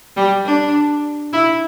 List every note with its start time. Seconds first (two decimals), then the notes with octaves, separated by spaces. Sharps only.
0.17 G3
0.45 D4
1.33 E4